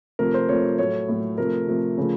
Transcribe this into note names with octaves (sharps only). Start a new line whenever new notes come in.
C3 F3 A3 A#4
C5
C3 F3 A3 C#5
A2 F#3 A3 C#5
A2 F#3 A3
C3 F3 A3 A#4
C3 F3 A3
C#3 F3 A3